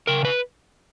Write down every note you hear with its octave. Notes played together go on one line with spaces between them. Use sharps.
C#3 A#4
B4